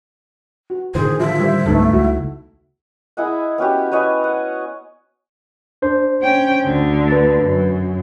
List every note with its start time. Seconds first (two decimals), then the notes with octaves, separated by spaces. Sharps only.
0.70 F#4
0.95 A2 D3 D#3 G#4 C5
1.20 F3 F4 E5
1.39 G3 C5
1.66 C#2 G#2 D3 A3 B3 D#4 A4
1.93 C#2 E4 F#4
3.17 E4 G#4 D#5 F#5
3.58 B3 C#4 F#4 G4
3.92 B4 C#5 D#5 G#5
4.24 F#5
5.82 D4 C5
6.22 C#4 G5
6.65 D2 D3
7.08 B4 A6
7.42 F#2